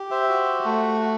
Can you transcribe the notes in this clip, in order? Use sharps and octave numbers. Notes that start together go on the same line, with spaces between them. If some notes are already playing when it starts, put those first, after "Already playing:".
Already playing: G4
C5 E5
F#4
A3
F#4